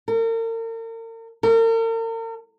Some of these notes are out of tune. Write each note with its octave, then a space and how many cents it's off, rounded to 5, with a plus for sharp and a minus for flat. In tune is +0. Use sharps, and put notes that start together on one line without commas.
A#4 -40
A#4 -45